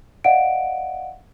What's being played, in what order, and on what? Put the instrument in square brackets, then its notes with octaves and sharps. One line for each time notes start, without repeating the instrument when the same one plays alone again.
[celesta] D5 D#5 F5 F#5 D7